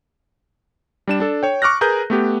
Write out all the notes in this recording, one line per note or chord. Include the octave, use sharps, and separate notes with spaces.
G3 D4 E7
D4 A4
C#5 G5
C#6 D6 F6 F#6 A#6
G#4 A#4 B4 A#5 G6
A3 B3 G4